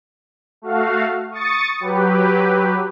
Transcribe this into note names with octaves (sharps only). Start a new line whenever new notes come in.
A3 F#4 F5
C#6 D#6 A6 C#7
F#3 G4 B4